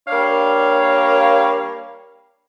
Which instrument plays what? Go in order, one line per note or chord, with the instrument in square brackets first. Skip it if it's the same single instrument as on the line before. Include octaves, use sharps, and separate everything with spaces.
[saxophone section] G3 A#3 D4 C#5 F5